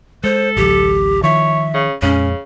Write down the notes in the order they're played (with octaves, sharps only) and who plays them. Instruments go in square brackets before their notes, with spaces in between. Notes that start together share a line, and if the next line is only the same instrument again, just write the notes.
[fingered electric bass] G#3 [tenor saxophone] A4 [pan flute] C5
[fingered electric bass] A1 D2 F#3 [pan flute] G4
[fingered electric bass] D#3 F3 [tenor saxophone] C#5 [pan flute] E5
[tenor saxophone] C#3
[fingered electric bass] F2 A#2 G#3 [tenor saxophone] C#3 [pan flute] C#4